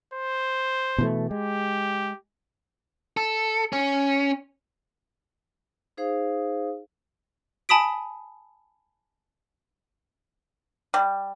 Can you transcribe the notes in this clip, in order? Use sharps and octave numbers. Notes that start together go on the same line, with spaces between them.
C5
B2 E3 A3
G#3 G4
A4
C#4
D#4 G#4 C5 F5 D#6
G#5 A5 B5 D#6 B6 D7
G3